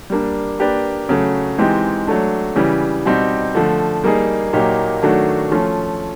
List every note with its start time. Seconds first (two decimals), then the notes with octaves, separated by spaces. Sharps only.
0.10 G3 A#3 D4
0.59 A#3 D4 G4 B4 D5
1.09 C#3 F#3 A3
1.58 E3 G#3 C4 D#4 G4
2.07 F#3 A3 D4
2.56 C#3 E3 G3
3.05 B2 G3 C4 D#4 G4
3.55 D3 F3 A3
4.04 G3 A#3 D#4 G#4
4.53 A#2 F#3 A#3 D#4 G4
5.03 D#3 F#3 A3 D4 F#4
5.51 F3 A3 C#4 F4